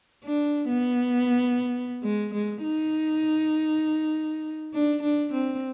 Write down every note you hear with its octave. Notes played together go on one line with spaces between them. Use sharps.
D4
B3
G#3
G#3
D#4
D4
D4
C4